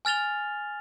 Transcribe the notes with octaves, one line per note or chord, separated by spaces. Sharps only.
G#5 F6 A6 F7 G7